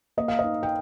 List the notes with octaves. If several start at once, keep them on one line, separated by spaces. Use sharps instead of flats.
A#3 D#5
F5
D#5
D#4
G5